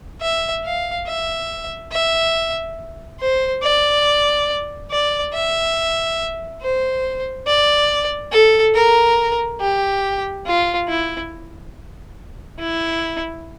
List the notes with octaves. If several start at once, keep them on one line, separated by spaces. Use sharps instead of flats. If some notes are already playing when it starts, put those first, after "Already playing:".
E5
F5
E5
E5
C5
D5
D5
E5
C5
D5
A4
A#4
G4
F4
E4
E4